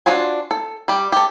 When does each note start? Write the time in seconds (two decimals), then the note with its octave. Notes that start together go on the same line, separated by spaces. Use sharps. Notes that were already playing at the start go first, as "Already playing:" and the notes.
0.06 D4 F4 F#4 C5 G#5
0.51 A4
0.88 G3 G4
1.12 G4 A4